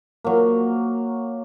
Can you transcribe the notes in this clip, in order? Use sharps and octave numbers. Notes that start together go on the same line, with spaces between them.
F#3 A#3